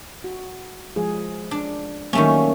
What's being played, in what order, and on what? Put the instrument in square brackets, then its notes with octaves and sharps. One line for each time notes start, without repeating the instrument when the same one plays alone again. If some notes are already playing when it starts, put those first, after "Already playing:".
[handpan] F#4
F3 G#3 G#4
[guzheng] D4
[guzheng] D#3 A3 C#4 [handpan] F#3 G3 A#3